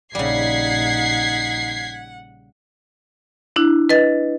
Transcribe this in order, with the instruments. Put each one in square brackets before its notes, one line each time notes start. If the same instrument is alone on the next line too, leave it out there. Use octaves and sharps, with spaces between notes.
[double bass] A#1 D#4 [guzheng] C#3 G3 [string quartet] F#5 [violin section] G#6 B6 C7
[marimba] D4 E4 F#6
B4 D#5 A6